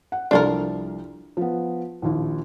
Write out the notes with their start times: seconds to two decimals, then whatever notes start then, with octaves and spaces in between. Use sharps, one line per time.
0.12 F#5
0.31 C2 F3 D4 A4 A#4
1.37 F3 B3
2.02 A#1 D#2 E4